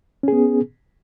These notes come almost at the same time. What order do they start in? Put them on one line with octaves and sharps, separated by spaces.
C#4 G#4 B3